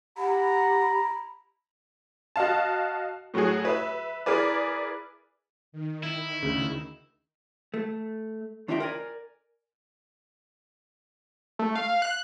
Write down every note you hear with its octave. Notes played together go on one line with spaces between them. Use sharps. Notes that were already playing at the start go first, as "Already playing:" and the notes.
G4 F#5 A#5 B5
F#4 D#5 F5 A5
A2 F#3 A3 F#4 G#4
B4 E5
E4 G#4 A#4 B4 D5
D#3
E4
D2 C#3
A3
D#2 D4 D#4 F4 E5 G5
A#4 D5 G#5
A3
F5
F#6